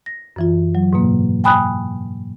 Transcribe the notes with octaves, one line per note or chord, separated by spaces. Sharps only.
A#6
F#2 E3 F4
F#3
G#2 B2 A#3
G5 G#5 B5 D#6 F#6